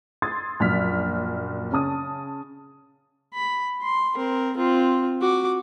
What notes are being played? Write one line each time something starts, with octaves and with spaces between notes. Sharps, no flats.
C6 D#6 E6 G#6 A6
A#1 F#2 F6 B6
C#3 C#4 A5 D#6
B5
C6
C4 A#4
C4 F4
F#4 D6